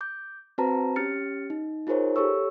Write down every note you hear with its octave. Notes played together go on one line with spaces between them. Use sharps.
D6 G6
C4 F#4 B4 C5 A5 A#5
C#4 G4 F6 A6 C#7
D#4
D#4 F4 G#4 A#4 C5 C#5
G4 A4 C#5 C#6 E6